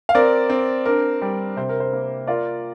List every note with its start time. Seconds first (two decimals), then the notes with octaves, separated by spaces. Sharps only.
0.09 F5
0.15 C4 A#4 D5
0.50 C4
0.86 D4 A#4
1.21 G3
1.57 C3 C5
1.69 A#4
1.80 C5
1.93 A#3
2.27 F4 A#4 D5